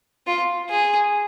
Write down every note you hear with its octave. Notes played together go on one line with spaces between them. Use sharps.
F4
G#4